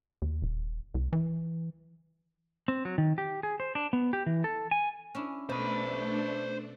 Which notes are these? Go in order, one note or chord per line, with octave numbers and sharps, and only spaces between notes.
D#2
D#1
C2
E3
C4
F#3
D#3
G4
G#4
C5
D4
B3
G4
E3
A4
G#5
C#4 D4 E4
B2 A3 D4 C5 B5